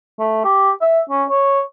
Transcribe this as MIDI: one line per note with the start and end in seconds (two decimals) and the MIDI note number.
0.19 0.42 57
0.45 0.71 67
0.81 1.00 76
1.10 1.24 61
1.30 1.60 73